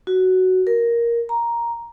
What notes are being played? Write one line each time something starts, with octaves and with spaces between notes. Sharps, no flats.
F#4
A#4
A#5